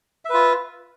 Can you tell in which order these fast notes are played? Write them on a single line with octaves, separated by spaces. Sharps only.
E5 B4 F4